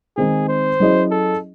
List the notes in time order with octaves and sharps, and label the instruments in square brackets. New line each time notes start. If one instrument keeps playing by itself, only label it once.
[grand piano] D#3 G#3 C4 D#4 [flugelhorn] G#4
[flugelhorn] C5
[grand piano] F#3 C#4 E4 G#4 D#5
[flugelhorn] A4